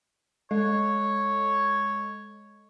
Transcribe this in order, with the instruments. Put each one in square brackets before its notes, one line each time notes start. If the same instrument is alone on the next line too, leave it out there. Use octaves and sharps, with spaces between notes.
[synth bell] G#3 A4 D#5 [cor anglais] C#5